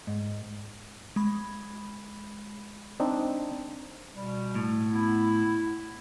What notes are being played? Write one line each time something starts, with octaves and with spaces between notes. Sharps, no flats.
G#2
G#3 B5
C4 D4 D#4
B2 G3
A2
B3 E4